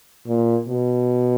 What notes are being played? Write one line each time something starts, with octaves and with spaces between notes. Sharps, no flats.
A#2
B2